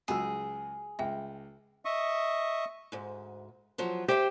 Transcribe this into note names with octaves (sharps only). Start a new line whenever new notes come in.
C#2 F#3 G#4 E6
C#2 E5 G5
D#5 E5 C#6 D#6
D2 G#2
E2 F3 F#3
G4 C5 E5 G5